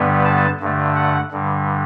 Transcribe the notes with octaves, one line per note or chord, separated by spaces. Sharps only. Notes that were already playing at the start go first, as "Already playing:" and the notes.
Already playing: G2 D3 G3 B3
A5
G2 D3 A3
F#5
G2 D3 G3